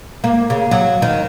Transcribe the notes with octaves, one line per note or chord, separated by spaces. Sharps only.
A#3
C#3
F#3
D#3